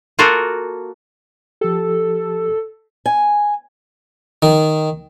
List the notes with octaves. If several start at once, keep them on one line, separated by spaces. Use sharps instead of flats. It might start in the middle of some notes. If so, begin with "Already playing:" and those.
A#3 F4 F#4 A4 A#4
F3 G4 A4
G#5
D#3